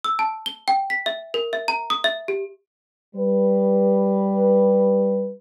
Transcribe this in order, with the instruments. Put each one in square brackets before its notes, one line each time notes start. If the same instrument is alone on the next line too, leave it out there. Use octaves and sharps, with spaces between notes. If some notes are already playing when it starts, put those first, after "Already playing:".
[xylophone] E6
A5
G7
G5
B6
E5
A#4
E5
A#5
D#6
E5
G4
[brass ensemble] G3 B4